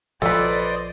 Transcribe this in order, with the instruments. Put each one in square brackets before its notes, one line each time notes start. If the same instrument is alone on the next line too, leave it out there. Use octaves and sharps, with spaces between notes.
[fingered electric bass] A#1 F3 [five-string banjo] A4 B4 [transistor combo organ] C5 D#5 [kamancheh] D5